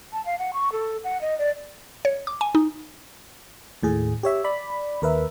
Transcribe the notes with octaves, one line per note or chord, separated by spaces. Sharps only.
A5
F5
F#5
C#6
A4
F#5
D#5
D5
C#5
D6
G#5
D#4
D#2 A2 G#4
G4 C#5 E5
D5 B5
D#2 A#4 B4 E5